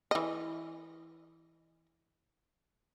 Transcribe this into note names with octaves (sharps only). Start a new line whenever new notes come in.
E3 D#5